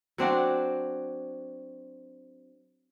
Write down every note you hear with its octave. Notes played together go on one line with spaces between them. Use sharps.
F#3 C4 D4 F#4